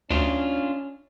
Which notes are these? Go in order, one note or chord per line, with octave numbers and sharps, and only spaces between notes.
D2 C#4 D4 F4